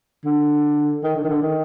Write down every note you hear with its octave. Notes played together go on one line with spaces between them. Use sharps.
D3
D#3
D3
D#3
D3
D#3